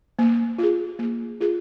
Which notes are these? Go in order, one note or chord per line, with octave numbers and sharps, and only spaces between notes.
A#3
F4 G#4
A#3
F4 G#4